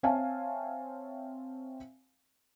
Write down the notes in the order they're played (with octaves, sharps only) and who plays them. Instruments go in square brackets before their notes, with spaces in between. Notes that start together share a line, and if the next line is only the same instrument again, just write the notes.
[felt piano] C4 C#5 E5 F5 G#5 A5